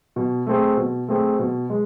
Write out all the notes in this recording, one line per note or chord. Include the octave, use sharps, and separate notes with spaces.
B2
A3 C4 G#4
B2
A3 C4 G#4
B2
G#3